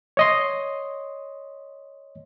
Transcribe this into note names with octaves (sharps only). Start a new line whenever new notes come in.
C#5 D#5 C6